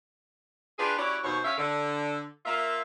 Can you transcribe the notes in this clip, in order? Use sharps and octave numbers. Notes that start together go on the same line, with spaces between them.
D4 F4 G4 G#4 B4
C#4 E4 F#4 G4 C#5 D5
D#2 B2 C5 C#5
C#4 E5 F5
D3
A#3 F4 E5